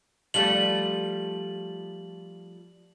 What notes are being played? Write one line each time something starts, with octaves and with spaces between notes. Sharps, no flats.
F3 G3 A3 F#7